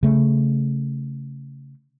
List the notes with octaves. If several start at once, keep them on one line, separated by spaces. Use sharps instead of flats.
C#3 A3